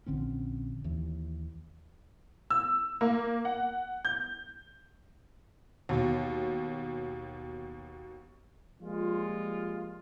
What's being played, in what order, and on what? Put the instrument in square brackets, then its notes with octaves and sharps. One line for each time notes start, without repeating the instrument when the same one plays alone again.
[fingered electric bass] A#1 D3 C4 C#4
D#2 E3
[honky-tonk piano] E6
A#3
F#5
G6
D#2 B2
[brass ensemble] F3 G3 G#3 A#3 F4